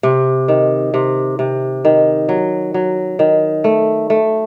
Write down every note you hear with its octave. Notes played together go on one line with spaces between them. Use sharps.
C3
D#3
C3
C3
D#3
F#3
F#3
D#3
A3
A3